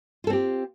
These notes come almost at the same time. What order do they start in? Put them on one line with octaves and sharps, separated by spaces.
F4 A4 C4 G4